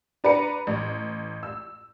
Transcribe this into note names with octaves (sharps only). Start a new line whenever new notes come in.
D4 B4 A#5 C#7
A1
E6